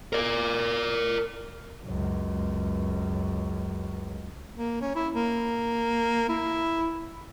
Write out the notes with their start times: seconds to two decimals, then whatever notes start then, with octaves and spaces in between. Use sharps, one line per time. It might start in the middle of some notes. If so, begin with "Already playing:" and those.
0.13 A#4 D5
1.83 C#2 F#2
4.57 A#3
4.81 C#4
4.95 E4
5.15 A#3
6.29 E4